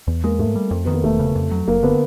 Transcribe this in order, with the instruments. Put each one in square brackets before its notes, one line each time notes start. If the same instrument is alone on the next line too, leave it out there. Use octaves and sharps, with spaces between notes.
[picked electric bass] E2 [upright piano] B3
[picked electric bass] G#3 [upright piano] A#3
[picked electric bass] G#2 [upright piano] A3
[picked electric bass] G3
F2
[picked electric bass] D#3 [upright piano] B3
[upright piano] A#3
[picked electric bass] E1 [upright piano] A3
[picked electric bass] C#3
F2
F#3
[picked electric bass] F#1 [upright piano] A#3
[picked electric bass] D3 [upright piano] B3